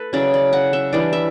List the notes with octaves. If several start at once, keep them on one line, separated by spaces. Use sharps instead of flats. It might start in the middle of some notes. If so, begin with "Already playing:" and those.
Already playing: A3 A4 B4
C#3 F#3 C#4 E4 D5
D5
F#5
E5
E3 G3 D4 D5
E5